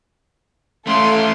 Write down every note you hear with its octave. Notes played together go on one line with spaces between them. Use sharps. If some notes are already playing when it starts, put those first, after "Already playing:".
A3 C#4 A4 F5 C6